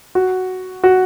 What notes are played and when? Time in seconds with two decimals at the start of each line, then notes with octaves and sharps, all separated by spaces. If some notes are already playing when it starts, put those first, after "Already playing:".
0.15 F#4
0.84 F#4